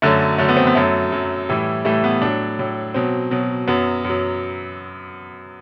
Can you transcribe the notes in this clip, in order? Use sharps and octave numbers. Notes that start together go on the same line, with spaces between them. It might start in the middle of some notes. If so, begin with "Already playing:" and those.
F#2 D3 F#3 A3
F#2 D3 F#3 A3
B3
C4
B3
F#2 F#3 A3
F#2 F#3
A2 E3 G3
A2 E3 G3 A3
B3
A2 F#3 D4
A2 F#3
B2 F#3 C4
B2 F#3
F#2 F#3 B3
F#2 F#3